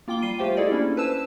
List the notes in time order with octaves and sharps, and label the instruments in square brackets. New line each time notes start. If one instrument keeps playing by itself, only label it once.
[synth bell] A#3 F4 G5 D6 G7
G3 C7 D#7
A3 F4 G4 C5 F5 G5
E4 G#4 A4 D5 D#5
A#3 C#4 D4 E4
B4 C5 A5 E6 E7